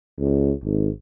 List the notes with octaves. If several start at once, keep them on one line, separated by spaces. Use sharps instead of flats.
C#2
G#1